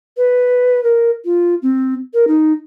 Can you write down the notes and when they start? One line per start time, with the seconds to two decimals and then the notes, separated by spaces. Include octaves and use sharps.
0.17 B4
0.83 A#4
1.25 F4
1.62 C4
2.14 A#4
2.27 D#4